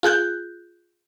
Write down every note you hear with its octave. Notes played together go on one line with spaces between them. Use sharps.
F4 G#4 F#6 G6